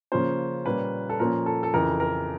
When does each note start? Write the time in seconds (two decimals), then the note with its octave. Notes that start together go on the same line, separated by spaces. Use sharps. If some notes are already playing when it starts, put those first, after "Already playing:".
0.12 C#3 F3 A#3 C#4 C5
0.65 A#2 G3 A#3 C#4 B4
1.09 A4
1.19 A#2 F3 A#3 C#4 A#4
1.46 A4
1.63 A4
1.73 F2 C#3 E3 A#4
2.00 A#4